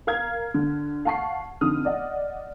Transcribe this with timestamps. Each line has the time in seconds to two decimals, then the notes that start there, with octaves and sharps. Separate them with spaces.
0.07 A#4 F5 F6 G#6
0.54 D3
1.05 F5 F#5 A5 C#6 C7
1.61 F2 D3 D#4 D#6 F6
1.85 D5 D#5 F#5